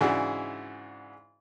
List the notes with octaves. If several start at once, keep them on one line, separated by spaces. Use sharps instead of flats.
G#2 C#3 E3 D4 E4 F#4